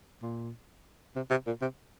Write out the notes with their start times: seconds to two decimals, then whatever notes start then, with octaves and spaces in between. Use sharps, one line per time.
0.22 A#2
1.16 C3
1.30 C3
1.47 A#2
1.62 C3